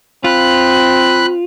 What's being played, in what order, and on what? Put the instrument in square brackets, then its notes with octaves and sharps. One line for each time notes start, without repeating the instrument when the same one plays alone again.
[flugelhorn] C4 [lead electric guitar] F4 [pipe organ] B5 F#6